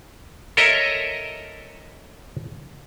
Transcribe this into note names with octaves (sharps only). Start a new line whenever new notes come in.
A4 A#4 C#5 D#5 E5 A#5